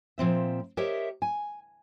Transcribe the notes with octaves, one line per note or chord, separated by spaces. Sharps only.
A#2 F3 C4 E5
G4 A#4 C5 C#5 D#5 E5
G#5